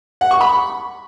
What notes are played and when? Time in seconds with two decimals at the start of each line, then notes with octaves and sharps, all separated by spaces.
0.21 F#5
0.31 C#6
0.41 B5